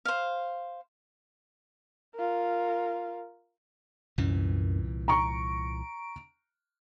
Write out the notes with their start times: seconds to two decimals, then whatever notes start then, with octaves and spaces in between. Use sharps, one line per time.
0.05 C5 F5
2.15 F4 A#4
4.18 C2 F#2 A#2 E3
5.08 A#5 C#6 D7